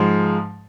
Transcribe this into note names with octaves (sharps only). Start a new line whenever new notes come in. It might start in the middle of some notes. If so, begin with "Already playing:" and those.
Already playing: G#2 F3 G#3